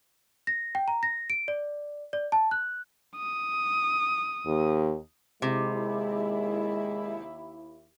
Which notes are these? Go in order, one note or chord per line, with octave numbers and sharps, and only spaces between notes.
A#6
G5
A#5
A#6
D7
D5
D5
A5
F#6
D#6
D#2
D#2 C3 G#3 E4